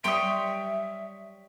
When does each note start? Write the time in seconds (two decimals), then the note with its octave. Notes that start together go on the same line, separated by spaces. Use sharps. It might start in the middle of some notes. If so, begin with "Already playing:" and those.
0.04 G3 C#5 E5 G5 C6 D#6 D7